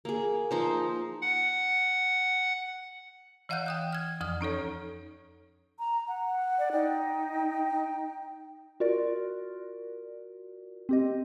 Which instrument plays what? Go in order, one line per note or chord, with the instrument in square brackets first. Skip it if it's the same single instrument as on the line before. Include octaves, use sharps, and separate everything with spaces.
[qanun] A#3 G#4
F3 D#4 C5
[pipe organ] F#5
[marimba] E3 D#5 F5 F#5 F#6 G6
G5 D#6 F#6
F6 G#6
F2 F3 D#6 F6
C#4 D#4 A4 C#5
[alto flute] A#5
F#5
[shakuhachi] D5
[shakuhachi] D#4 [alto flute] G5
[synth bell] F4 F#4 A#4 D5
C4 G4 D#5